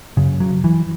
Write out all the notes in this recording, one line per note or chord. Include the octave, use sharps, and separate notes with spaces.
F#2 C#3
F#3
E3